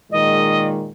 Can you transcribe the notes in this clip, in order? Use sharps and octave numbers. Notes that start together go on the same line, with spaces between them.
A#2 D#3 G#3 D#5